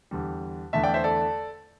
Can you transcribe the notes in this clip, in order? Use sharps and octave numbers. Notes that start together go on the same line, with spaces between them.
E2 D3 G3
E2 D3 A3 E5 A5
D5 G5
C5 E5
A4 D5